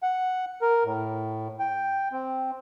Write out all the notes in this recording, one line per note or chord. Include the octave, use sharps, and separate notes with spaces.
F#5
A#4
A2
G5
C4